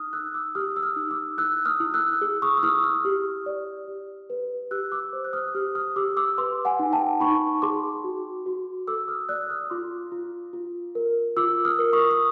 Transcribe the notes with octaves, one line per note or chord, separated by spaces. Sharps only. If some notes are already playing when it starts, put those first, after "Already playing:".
Already playing: D#4 D#6 F6
D#4 E6 F#6
D6 E6
G4 D#6 F6
E6
D#6 F6
D#4
D6 E6
E4 E6 F#6
D#6 F6
E4
E6 F#6
G#4
C#6 D#6
E6
E4 D#6 F6
D#6 F6
G4
D5
G4
B4
G4 E6 F#6
D6 E6
C5
F#6
D#6 F6
G4 D#6 F6
D#6 F6
G4 D6 E6
D6 E6
B4 C6 D6
F#5 G#5
D#4
G5 A5
D#4 B5 C#6
G#4 C6 D6
F#4
F#4
A4 D6 E6
D#6 F6
D5 E6 F#6
D#6 F6
F4 C6 D6
F4
F4
A#4
F4 D6 E6
D#6 F6
A#4
C#6 D#6
D#6